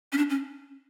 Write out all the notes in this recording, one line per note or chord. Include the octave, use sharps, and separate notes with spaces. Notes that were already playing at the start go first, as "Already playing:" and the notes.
C#4
D4
C#4